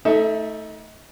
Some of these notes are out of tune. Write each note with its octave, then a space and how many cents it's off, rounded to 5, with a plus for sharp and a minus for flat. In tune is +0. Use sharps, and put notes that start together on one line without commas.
A3 +0 D#4 +30 E5 +0